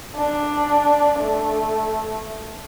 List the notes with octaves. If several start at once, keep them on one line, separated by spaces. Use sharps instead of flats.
D4
A3